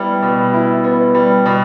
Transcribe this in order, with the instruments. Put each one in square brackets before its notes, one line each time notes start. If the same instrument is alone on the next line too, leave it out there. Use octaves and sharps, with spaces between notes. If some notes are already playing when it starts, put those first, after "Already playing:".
Already playing: [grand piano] G3 B3 E4
B2
E4
B3
G3
B2